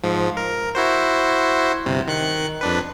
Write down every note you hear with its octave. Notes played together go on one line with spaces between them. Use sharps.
G#2 F3
A#4
E4 F#4 C5
G1 C3
D#3 F#6 C#7
F2 D4 B4